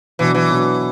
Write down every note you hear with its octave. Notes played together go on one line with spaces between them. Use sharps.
B2 E3 F#3 D4 F#4
E3
B2 F#3 D4 F#4